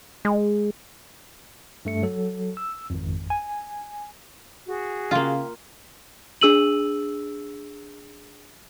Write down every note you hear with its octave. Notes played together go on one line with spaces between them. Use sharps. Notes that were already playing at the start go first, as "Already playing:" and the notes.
G#3
G2 A3 C#7
F#3 A4
E6
G#1 F2
G#5
F#4 G#4
C#3 A#3 F4 E5 F5 G5
D4 G#4 E6 D#7 F#7